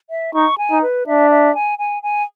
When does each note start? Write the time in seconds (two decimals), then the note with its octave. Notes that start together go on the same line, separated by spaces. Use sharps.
0.10 E5
0.34 D#4 C#6
0.58 G#5
0.71 D#4
0.82 B4
1.07 D4 E5
1.31 E5
1.55 G#5
1.79 G#5
2.03 G#5